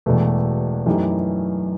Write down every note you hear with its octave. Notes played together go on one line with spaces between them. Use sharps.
E1 E2 B2 A3
F#2 E3 A3 D#4 G4